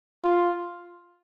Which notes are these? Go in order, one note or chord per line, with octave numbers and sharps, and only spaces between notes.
F4